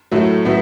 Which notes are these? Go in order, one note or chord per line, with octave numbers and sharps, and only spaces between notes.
A2 F#3 A3
A2 F#3 B3 E4